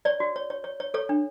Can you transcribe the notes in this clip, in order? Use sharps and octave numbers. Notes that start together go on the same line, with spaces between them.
C#5 D5
F#4
C#5
C#5
C#5
C#5
A4 C#5
D4